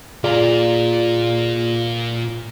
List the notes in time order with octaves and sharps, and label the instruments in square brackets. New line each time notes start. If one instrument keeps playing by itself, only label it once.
[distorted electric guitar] A#2 A#5 [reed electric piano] F4 G#4 D5